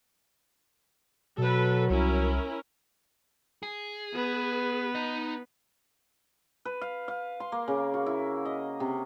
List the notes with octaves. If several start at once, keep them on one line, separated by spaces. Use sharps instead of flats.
B2 F#3 A4 B4
C2 C#4 E4 A#4
G#4
B3 B4
D#4 D#5
B4
F5
F5
C6
A#3
C#3
F#4
E4
D#5
C3